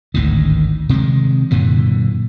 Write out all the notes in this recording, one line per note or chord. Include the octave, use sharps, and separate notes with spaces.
G#1 D2 A2 D#3
C3 D#3 G3 G#3
F#2 A#2 D3 E3